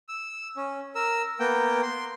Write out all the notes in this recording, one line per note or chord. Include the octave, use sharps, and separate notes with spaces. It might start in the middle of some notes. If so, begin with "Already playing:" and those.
E6
C#4
A#4 E6
A#3 B3 G5
C6